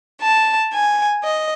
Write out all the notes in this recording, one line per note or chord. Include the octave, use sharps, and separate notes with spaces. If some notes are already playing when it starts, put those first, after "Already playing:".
A5
G#5
D#5